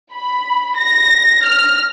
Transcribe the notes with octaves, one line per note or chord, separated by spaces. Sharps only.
B5
A#6
F6